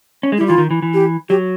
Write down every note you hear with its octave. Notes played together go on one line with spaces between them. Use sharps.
C#4
G#3
G3 E4
E3 F4
D#3
E3
E3
G4
F#3 G4